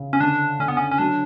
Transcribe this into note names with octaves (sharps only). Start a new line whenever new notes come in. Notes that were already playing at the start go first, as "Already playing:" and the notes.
Already playing: C#3
C#4
D3 D4
D3 C#4
B3
C#4
C#4
F#3 D4